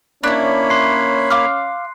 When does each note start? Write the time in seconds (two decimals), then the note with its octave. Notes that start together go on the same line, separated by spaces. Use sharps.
0.23 A#3 C#4 D4 E4 C#5 B5
0.70 C6 F#6 C7
1.30 F5 D6 F6